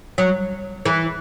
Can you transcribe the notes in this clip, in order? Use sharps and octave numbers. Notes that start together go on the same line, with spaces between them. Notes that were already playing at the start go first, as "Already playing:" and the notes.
F#3
E3